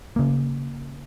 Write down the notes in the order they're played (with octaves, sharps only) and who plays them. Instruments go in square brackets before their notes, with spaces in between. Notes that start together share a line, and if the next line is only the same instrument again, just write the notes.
[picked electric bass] C#3 A#3